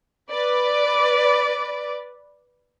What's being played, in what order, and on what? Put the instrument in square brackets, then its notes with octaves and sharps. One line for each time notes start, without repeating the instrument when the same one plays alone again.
[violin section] B4 D5